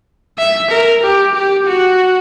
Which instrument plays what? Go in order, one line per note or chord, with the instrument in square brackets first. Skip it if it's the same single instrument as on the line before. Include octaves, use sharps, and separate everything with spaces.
[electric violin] E5
A#4
G4
G4
F#4